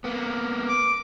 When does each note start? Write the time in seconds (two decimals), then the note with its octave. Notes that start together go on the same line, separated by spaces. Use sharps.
0.04 A#3 B3
0.68 D6